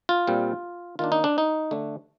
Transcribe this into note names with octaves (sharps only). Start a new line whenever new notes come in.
F4
A#2 G3 C4
D#3 A#3 D4 F4
D#4
D4
D#4
D3 A3 D4